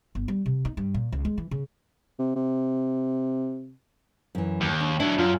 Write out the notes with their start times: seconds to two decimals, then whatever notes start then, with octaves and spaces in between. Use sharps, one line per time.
0.15 G1
0.28 G3
0.46 C3
0.65 D#4
0.77 G2
0.94 A#2
1.12 C#2
1.25 G#3
1.38 E3
1.51 C#3
2.19 C3
2.36 C3
4.35 F#2 E3
4.61 D#2
4.80 D4
5.00 F#3 D4 E4
5.18 F#2 F4